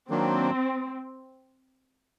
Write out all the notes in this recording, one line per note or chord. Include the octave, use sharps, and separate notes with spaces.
D#3 F#3 A#3 C4 D4